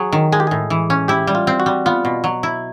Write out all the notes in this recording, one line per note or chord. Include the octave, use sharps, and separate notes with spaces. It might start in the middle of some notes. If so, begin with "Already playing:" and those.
Already playing: F#3 G#4
D#3
G#3 G#4
G4
A2 G#4
E3
C#4
E4 G4
G3
F4
C4
F#4
G3
B3 F4
B2
F#3
E4